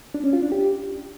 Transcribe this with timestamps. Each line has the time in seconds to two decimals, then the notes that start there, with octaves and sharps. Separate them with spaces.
0.14 D4
0.24 C#4
0.33 F4
0.42 D4
0.52 G4